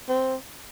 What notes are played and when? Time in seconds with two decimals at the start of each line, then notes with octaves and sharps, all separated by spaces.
0.09 C4